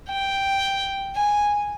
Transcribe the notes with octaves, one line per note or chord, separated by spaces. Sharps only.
G5
G#5